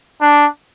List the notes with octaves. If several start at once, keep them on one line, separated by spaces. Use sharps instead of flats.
D4